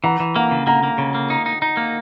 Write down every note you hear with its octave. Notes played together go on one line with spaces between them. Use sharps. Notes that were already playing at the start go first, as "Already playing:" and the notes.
E3 F#5 A#5
E3
A#3 F#5 A#5
C#3
A#3 F#5 A#5
A#3
C#3
A#3
D#4
D#4
D#4
A#3